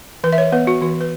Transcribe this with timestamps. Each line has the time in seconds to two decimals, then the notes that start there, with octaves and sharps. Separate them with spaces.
0.24 E3 B4
0.33 E5
0.38 C#5
0.52 B3 B4
0.67 F#4
0.82 E3 F#4
1.01 B4